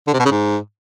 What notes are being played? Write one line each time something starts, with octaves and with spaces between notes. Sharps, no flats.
D3
C3
B2
C#3
G#2